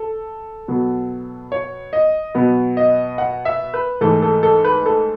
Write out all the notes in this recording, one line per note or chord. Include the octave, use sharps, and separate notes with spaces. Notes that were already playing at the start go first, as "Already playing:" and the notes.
Already playing: A4
B2 F#3 B3
C#5
D#5
B2 F#3 B3
D#5
F#5
E5
B4
G#2 E3 A3 A4
A4
A4
B4
A4